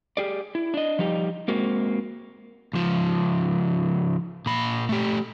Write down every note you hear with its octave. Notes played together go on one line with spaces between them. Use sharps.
G4 G#4 D5
E4
D4 D#5
F3 G3 D#4 G4
G#3 A#3 C4 F#4
C#2 F3
A#2 B5
A3 G4